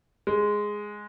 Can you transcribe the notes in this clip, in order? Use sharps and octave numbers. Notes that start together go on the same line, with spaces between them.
G#3